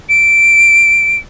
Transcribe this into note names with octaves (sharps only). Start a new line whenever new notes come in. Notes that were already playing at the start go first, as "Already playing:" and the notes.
D7